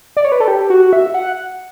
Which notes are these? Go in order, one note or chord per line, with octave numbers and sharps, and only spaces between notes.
D5
C#5
B4
A4
G4
F#4
E5
F#5